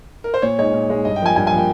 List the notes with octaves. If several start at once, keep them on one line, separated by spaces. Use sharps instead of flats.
A#4
C5
A#2 C#5
G#3 D#4 C#5
A#2
G#3 D#4
G2 D#5
G5
F3 A#3 G#5
G2 G#5
G#5
F3 A#3 G5